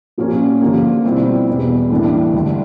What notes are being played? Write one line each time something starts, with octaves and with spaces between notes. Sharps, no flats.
A#2 F3 A#3 C#4
D3 F3 A#3
B2 G3 C4 E4
E2 B2 G3
A2 E3 G3 A#3 D4
D2 D3 G3